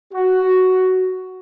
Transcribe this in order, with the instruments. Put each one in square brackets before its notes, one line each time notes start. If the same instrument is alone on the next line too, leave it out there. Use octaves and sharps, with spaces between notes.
[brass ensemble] F#4